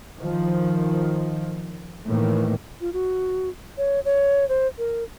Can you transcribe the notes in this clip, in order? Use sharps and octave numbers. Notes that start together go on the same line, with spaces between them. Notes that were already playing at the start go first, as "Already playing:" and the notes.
D#3 F3
A2 D#3 E3 A#3
F4
F#4
C#5
C#5
C5
A#4